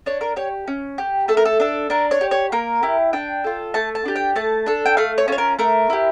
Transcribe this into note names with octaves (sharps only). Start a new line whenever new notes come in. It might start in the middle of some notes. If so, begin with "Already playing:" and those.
D4 C#5
A#4
G4 C#5
C#4
G4
A3 A4
A#4
A4
D4 A4
D4 A#4
C#5
G4
C#5
A#3 A#4
E4 G4
D4 G5
F4 A4
A3 A5
A5
D4 G4
G5
A3 A5
D4 A4
G5
A3 F5
C#5
C#4 F4 A4 C#5
A#4
A3 A#4
E4 G4